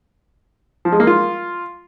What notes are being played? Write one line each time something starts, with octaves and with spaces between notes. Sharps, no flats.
F3
G#3
A#3
F4